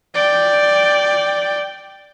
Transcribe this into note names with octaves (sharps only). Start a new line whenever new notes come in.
D5 G5